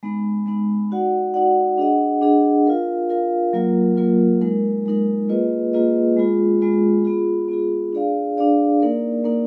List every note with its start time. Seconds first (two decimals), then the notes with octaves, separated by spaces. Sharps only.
0.03 G#3 B3 D#4
0.46 G#3 B3 D#4
0.91 D#4 F#4 D5 F#5
1.34 D#4 F#4 D5 F#5
1.78 D4 G#4 D#5 F#5
2.21 D4 G#4 D#5 F#5
2.66 F4 A#4 F5
3.10 F4 A#4 F5
3.53 F#3 A#3 F4 A#4
3.97 F#3 A#3 F4 A#4
4.41 G#3 D#4 A#4
4.86 G#3 D#4 A#4
5.29 A#3 F4 G#4 B4 D#5
5.73 A#3 F4 G#4 B4 D#5
6.17 G#3 B3 F4 G#4
6.61 G#3 B3 F4 G#4
7.04 B3 F4 G#4
7.48 B3 F4 G#4
7.93 D4 G#4 D5 F5
8.37 D4 G#4 D5 F5
8.80 A#3 D#4 A#4 D5
9.24 A#3 D#4 A#4 D5